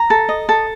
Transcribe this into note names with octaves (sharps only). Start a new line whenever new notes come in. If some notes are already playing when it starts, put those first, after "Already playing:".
Already playing: A#5
A4
D#5
A4